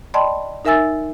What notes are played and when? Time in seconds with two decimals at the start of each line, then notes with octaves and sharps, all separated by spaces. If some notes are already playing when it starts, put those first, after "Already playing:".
0.14 D5 D#5 G5 A5 B5 C6
0.65 D#4 A#4 E5 G#5 E6 A6